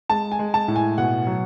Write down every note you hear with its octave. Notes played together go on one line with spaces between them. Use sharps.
G#3 A5
G#5
G#3
A5
A2
G#5
B2 F#5
F#3